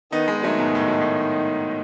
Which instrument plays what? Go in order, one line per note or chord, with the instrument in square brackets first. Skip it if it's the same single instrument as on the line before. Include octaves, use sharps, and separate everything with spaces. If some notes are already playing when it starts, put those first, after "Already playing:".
[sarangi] D#3 [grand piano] B3 D#4
[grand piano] G#3 B3
[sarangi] D#3 [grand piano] F#3 A3
[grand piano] G#2 B2
A2
B2
A2